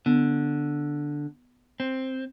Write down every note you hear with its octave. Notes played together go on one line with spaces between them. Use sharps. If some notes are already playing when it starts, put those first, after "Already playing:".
D3 B3
C4